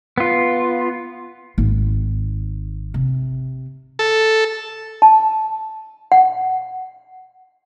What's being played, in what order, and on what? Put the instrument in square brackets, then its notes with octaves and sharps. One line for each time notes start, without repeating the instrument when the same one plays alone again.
[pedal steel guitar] B3 F4
[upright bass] G#1
C3
[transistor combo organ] A4
[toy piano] A5
F#5